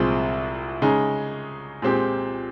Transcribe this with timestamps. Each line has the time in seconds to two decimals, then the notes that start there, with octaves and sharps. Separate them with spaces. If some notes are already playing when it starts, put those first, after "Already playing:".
Already playing: C2 A#2 F3 G#3 C4
0.82 C#3 G#3 D#4 G#4
1.82 A#2 G#3 C4 G4